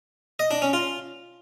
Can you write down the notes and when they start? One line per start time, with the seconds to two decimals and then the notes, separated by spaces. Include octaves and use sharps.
0.39 D#5
0.51 D4
0.62 C#4
0.73 F4